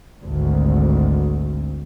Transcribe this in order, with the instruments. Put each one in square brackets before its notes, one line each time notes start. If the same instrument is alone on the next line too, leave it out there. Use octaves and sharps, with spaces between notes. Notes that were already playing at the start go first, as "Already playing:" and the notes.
[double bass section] G#1 D2